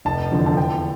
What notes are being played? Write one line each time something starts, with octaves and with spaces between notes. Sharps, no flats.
F1 A5
E2 D3 F3
A5
E2 G5